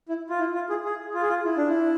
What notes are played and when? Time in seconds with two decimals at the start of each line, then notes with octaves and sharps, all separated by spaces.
0.09 E4
0.30 F4
0.39 E4
0.54 F4
0.69 G#4
0.85 G#4
1.15 F4
1.22 G#4
1.29 F4
1.45 E4
1.57 D4
1.68 E4